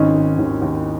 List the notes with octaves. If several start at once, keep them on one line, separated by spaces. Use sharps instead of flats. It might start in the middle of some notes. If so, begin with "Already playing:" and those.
Already playing: G#1 D#3 C#4 D#4
D#3
D#2
D#2